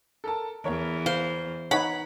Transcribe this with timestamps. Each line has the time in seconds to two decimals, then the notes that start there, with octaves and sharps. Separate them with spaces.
0.24 A4 A#4 A5
0.64 E2 A#4 C#5
1.06 C5 F5
1.71 D#4 B4 C#5 F#5 A#5 B5